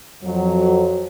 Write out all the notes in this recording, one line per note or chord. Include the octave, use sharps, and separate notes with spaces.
F2 F#3